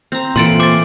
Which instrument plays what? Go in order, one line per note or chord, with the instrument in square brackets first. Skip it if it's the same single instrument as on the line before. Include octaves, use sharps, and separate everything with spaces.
[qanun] C4 A#5
[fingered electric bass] A#2 [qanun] E3 F4 A4 [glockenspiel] C6 A6 D7
[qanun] C5 [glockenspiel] D6 A6